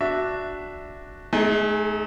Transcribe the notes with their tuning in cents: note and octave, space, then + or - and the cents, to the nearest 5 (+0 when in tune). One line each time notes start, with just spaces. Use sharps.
D4 +0 F#4 +0 E5 +0
A3 -40 D#4 +0 G#4 +0